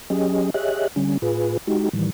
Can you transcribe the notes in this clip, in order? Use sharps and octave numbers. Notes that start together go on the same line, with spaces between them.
F#3 C#4 G4 G#4 D#5
G4 G#4 C#5 D#5 E5 F#6
D3 G3 C#4
A2 F4 G#4 B4
G#3 D#4 F#4 G4
A2 D#3 E3 G3